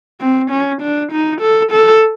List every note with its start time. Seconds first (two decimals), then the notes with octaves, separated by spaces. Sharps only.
0.20 C4
0.51 C#4
0.82 D4
1.12 D#4
1.41 A4
1.72 A4